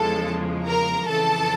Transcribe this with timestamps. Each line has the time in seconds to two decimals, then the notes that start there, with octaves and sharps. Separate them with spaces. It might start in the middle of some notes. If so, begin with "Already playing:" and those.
Already playing: E2 C#3 F3 G#3 A4 A5
0.67 A#4 A#5
1.07 F2 C#3 E3 A4 A5